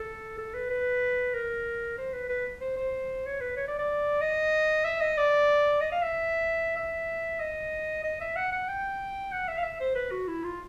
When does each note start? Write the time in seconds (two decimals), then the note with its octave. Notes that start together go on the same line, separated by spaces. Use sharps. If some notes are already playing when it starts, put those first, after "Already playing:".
Already playing: A4
0.38 A4
0.54 B4
0.70 B4
1.34 A#4
1.98 C5
2.13 B4
2.29 B4
2.61 C5
2.77 C5
3.26 C#5
3.41 B4
3.57 C#5
3.68 D5
3.79 D5
4.21 D#5
4.84 E5
5.01 D#5
5.17 D5
5.81 D#5
5.92 F5
6.02 E5
6.77 E5
7.40 D#5
8.04 D#5
8.21 E5
8.36 F#5
8.52 F#5
8.68 G5
9.32 F#5
9.48 E5
9.57 F5
9.63 E5
9.81 C5
9.95 B4
10.11 F#4
10.28 E4
10.44 F4